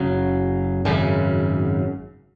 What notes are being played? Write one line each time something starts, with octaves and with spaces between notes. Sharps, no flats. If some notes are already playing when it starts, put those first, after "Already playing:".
Already playing: F#1 C#3 F#3
G#1 F#2 C#3